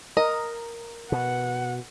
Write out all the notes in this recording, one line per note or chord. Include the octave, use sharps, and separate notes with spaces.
A#4 D#5
B2 F#5